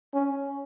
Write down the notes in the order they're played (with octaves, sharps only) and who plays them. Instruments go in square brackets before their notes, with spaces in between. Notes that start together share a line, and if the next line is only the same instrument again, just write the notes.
[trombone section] C#4